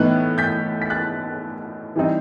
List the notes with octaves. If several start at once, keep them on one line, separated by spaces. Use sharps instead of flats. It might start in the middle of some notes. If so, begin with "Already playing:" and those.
Already playing: A2 E3 B3 D#4 F#6
G6 B6
B6
F#6 A6
E3 G3 C4 D#4